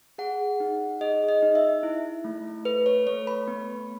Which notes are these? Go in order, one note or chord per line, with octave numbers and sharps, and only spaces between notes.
G#4 F#5
D#4
G#4 D#5
D#5
D#4
E5
E4
A3
A4 B4
C#5
A3 C#5
B5
B3